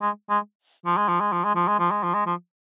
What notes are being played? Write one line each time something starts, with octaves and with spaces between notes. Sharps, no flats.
G#3
G#3
F3
G#3
F3
G#3
F3
G#3
F3
G#3
F3
G#3
F3
G#3
F3